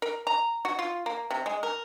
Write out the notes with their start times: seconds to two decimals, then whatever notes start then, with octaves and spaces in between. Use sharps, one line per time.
0.02 A#4
0.27 A#5
0.65 F#4
0.79 F4
1.06 A#3
1.31 C3
1.46 G#3
1.63 A#4